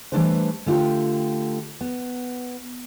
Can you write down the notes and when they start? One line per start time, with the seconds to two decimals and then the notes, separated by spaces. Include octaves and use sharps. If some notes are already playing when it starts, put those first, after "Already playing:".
0.12 E3 G3 A3 D4 B4 C5
0.66 D3 A3 F4 G4 G5
1.81 B3